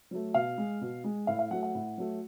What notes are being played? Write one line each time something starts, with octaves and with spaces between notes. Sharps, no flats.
F#3 A3
B2 F5
G#3
B2
G#3
A2 F5
F5
F#3 A3 F#5
F#5
A2
F#3 A3